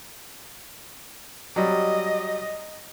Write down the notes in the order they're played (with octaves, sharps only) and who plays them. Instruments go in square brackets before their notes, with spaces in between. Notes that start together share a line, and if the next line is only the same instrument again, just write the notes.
[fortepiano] F#3 G3 D5 [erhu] D#5